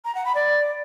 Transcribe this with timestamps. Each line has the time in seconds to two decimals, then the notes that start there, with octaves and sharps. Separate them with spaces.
0.05 A#5
0.15 F#5
0.25 B5
0.35 D5